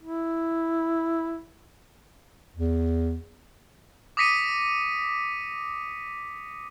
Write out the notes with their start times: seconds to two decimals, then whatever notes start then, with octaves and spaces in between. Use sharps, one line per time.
0.03 E4
2.56 E2
4.17 D6 D#6 A#6 B6 C#7 D#7